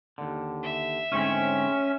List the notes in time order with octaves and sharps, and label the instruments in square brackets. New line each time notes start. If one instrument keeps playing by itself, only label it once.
[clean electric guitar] D#2 D3
[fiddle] E5
[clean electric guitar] D2 G#2 C4 [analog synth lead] C#4